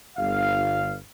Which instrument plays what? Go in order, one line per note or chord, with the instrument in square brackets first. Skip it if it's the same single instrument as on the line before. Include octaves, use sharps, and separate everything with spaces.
[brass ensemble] G1 F5